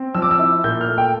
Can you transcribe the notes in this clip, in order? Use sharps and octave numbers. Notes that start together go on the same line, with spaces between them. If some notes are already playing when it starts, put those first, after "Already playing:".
Already playing: C4
F3 E6
D6
E6
E4
A#2 G6
F6
A3
G5